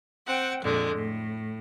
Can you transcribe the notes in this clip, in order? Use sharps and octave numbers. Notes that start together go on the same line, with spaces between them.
C4 F#5 G5
F2 A#2 D3 G#3
A2